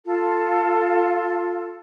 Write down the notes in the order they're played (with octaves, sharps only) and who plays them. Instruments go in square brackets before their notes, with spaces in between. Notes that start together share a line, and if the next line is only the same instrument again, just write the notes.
[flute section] F4 A4